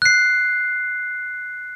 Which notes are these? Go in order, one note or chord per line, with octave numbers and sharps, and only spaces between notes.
F#6 C7